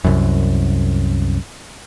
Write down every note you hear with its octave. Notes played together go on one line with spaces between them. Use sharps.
C2 F#2